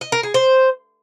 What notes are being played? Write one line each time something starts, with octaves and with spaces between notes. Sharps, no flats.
D#5
A#4
G#4
C5